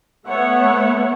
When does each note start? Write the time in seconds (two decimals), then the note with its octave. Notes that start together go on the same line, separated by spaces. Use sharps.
0.27 A3 B3 C#5 E5 F#5